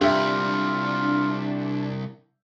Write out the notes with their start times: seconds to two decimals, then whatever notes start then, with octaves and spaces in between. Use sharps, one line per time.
0.01 C2 D4 F4 G4 E5